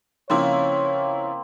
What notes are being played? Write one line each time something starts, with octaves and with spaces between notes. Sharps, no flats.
C#3 F3 A#3 C4 E4 C#5